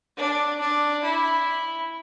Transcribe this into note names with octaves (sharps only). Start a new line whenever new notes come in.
D4
D4
E4